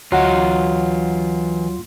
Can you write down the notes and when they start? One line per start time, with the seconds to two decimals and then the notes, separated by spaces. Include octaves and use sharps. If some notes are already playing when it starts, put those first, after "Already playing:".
0.12 D2 E3 F#3 F4 D#5 F#5